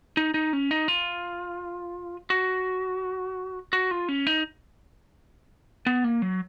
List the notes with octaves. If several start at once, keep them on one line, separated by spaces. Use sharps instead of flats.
D#4
D#4
C#4
D#4
F4
F#4
F#4
F4
C#4
D#4
B3
A#3
F#3